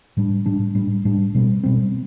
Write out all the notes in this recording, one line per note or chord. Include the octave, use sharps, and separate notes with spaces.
A2 G3 D4
A2 G3 D4
A2 G3 D4
A2 G3 D4
B2 G3 C4
B2 G3 C4